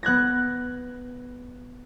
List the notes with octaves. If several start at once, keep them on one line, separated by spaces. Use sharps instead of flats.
B3 F#6 G#6 A#6